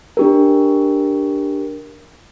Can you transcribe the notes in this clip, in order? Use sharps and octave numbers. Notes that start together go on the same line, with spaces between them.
D4 G4 A#4